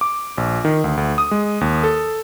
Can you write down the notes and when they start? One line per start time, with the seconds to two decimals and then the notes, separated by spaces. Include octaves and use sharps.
0.01 D6
0.38 A#1
0.65 D#3
0.84 D2
0.97 D2
1.18 D#6
1.31 G#3
1.61 D#2
1.84 A4